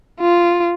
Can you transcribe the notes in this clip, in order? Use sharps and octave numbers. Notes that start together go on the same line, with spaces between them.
F4